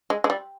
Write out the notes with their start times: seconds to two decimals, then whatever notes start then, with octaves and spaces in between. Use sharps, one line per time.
0.10 G#3
0.24 G#3
0.30 G3